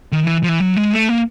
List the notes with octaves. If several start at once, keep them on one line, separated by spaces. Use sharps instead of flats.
D#3
E3
F3
E3
F#3
G#3
A3
A#3